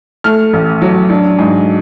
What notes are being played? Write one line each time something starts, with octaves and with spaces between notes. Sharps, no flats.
A3 F6
A1
F#3
D4
G#2